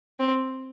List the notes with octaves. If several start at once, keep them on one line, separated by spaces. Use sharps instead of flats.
C4